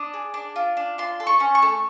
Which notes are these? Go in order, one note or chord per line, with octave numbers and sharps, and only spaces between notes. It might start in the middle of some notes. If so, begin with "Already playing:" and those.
Already playing: D4 D#6
G#4
D4
F4
D4
F4 C6
A4
C#6
C#4
C#6
A3